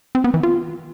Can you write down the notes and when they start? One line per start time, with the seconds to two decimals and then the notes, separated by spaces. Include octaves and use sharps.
0.15 C4
0.24 B3
0.34 E3
0.43 F4